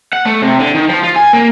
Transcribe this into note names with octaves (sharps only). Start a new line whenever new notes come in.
F#5
A3
C3
D3
D#3
F3
F4
G#5
A#3